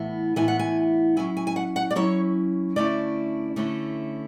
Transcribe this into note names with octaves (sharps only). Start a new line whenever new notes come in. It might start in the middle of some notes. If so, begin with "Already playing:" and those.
Already playing: A2 E3 B3 E4
A2 E3 B3 E4 G#5
F#5
G#5
F#3 C#4 E4 G#5
G#5
G#5
F#5
F#5
D5
F#3 C#4 E4 C#5
D3 A3 C#4 E4 D5
D3 A3 C#4 E4